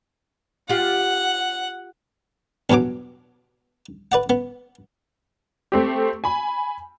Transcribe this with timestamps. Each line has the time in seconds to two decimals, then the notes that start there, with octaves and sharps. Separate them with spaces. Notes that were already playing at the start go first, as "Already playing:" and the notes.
0.69 F4 G4 F#5
2.70 E2 G2 B2 F#3 D6
4.12 B4 D5 F#5
4.30 B3
5.72 A3 C4 G4
6.24 G#5 B5